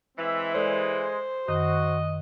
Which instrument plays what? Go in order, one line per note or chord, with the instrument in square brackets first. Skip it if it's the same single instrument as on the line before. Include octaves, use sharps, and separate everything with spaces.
[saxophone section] E3 [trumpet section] G#3 C4 E5
[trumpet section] G#3 [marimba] A4 D5 [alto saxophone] C5
[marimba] F#2 D#3 [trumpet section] F#4 [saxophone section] D#5